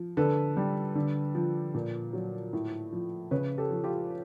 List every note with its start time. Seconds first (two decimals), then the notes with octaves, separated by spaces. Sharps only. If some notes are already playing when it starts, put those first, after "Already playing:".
Already playing: F3
0.17 D3 A4 B4
0.57 G3
0.95 D3
1.35 F3
1.74 A#2
2.13 F#3
2.53 A2
2.92 F3
3.31 C#3 B4 C#5
3.58 G4 A4
3.71 F3
3.84 F4 G4